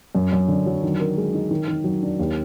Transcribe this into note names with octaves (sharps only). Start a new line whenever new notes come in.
F#2
F#2
D3
F#3
D#3
A#4
G#3
D#4
D#3
D#3
F#3
D4
D#2